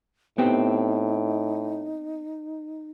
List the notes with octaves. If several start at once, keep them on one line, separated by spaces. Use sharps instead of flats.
A2 B3 C4 D#4 G4